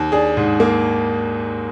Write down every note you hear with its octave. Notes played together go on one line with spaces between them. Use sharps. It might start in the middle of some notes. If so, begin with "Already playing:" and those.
Already playing: D#2
D4 G#4
G#2
A#3